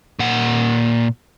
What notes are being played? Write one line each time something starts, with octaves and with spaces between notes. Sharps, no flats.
A#2 F#5